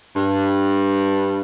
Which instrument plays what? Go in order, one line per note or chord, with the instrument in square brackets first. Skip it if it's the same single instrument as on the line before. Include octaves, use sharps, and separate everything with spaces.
[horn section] G2